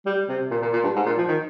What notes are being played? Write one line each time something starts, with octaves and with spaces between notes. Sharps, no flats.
G3
C3
A#2
A#2
A#2
G2
G#2
A#2
F3
D#3